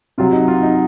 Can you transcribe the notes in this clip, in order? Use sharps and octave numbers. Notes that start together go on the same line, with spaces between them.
C3 F#3 F4
D#4
F4
D#4